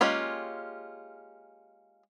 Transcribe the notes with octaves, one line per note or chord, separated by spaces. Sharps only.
G#3 A#3 C#4 F4 G4